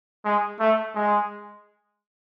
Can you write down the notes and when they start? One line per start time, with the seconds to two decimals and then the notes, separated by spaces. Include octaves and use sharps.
0.25 G#3
0.60 A3
0.95 G#3